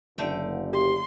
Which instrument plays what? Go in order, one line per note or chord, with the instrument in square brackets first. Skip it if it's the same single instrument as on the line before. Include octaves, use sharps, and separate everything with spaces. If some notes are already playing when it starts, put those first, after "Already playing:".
[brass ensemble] F#1 [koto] D3 A3 G5
[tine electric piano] G4 [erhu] C6